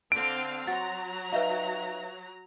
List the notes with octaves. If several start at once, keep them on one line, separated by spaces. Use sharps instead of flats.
D3 C4 F5 D7
F#3 F#4 A#5 C6 A6
D#4 B4 E5 F5 G5